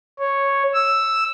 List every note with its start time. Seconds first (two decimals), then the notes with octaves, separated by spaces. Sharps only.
0.19 C#5
0.74 E6